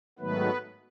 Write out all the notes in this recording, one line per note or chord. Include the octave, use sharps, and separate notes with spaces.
G#2 D#3 F#3 A3 B3 B4